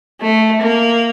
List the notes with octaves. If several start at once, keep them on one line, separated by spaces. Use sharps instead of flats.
A3
A#3